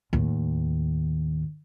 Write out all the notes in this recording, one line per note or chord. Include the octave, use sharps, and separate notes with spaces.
D#2 A2